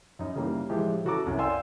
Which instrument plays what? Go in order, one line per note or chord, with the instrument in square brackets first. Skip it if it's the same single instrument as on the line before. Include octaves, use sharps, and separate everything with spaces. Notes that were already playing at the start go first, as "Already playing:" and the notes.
[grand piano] F#2 D#4
C#3 E3 G3 A#3
A2 E3 F3 G#3 E4 G4
C#3 E3 F#4 A4 A#5 D6
C2 F#2 C#4
D5 F5 G5 G#5 C6 E6